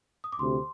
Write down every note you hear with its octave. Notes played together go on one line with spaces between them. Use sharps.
D#6
D6
D2 C3 C6